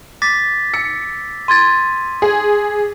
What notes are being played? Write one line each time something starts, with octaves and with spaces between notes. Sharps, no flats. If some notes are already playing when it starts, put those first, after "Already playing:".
D6 A6 B6
E6 C#7
C6 G#6 A6 D#7
G#4